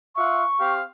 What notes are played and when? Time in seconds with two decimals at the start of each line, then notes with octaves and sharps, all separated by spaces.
0.16 F4 E5 F#5 C#6
0.59 C4 G4 F5